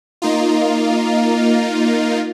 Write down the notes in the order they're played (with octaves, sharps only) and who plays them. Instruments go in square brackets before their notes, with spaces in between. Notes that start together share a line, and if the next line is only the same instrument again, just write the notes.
[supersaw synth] A#3 D#4 F4